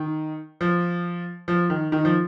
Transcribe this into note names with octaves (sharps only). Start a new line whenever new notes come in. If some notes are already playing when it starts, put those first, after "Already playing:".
Already playing: D#3
F3
F3
D#3
D#3
F3